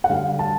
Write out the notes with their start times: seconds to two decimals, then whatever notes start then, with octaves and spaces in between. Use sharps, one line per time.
0.04 F#5
0.09 D3 G3 F5
0.39 A5